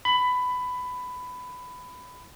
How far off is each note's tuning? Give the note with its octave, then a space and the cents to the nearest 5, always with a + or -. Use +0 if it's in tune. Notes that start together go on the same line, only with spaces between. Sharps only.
B5 +15